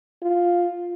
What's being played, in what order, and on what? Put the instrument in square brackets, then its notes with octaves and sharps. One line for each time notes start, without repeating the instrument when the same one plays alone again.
[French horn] F4